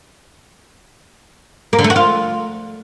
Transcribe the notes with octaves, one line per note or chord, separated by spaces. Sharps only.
A#3
D3
A3
F#4
F4